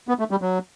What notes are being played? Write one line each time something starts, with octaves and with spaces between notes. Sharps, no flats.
B3
A3
G3
F#3